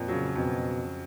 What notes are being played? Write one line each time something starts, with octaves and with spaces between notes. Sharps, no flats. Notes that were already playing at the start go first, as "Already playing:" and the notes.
Already playing: F2 A#2
C#3 F#3
F2 B2